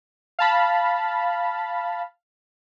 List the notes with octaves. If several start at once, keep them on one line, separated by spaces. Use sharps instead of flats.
F5 A5 B5